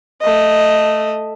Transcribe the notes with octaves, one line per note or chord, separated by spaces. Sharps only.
A3 D#5